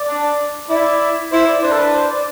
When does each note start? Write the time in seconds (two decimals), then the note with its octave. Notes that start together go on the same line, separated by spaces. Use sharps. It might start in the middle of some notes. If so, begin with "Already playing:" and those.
Already playing: D5
0.09 D4
0.70 E4 D5
1.32 E4 C5
1.48 D5
1.62 D4 C5
1.72 A4
1.78 B4
1.94 C5
2.10 D5